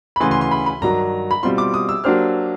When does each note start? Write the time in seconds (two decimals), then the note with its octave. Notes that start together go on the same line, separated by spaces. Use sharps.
0.16 B5
0.20 D2 C#3 E3 C6
0.31 C6
0.41 C6
0.51 B5
0.66 B5
0.82 G2 D#3 F#3 A#5
1.31 B5
1.43 B2 G3 C4 F4 C6
1.58 D6
1.74 D#6
1.89 E6
2.04 F#3 A#3 D4 G4 C5 F6